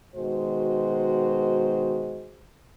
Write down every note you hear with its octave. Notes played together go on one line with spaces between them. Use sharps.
B2 D#3 G#3 F#4 C5